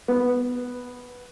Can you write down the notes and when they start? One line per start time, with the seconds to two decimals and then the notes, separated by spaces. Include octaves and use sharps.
0.08 B3